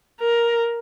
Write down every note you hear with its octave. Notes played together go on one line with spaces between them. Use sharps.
A#4